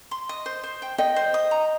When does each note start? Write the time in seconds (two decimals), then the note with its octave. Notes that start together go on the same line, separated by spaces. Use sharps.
0.11 C6
0.29 D#5
0.46 C5
0.64 C5
0.82 G5
0.98 D#5 G5
1.16 C5
1.34 D#6
1.51 A#5